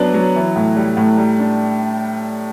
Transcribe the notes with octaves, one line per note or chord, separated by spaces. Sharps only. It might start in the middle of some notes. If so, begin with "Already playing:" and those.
Already playing: F#3 B3 D4
F#3
E3
A2
G3
A2
G3
D4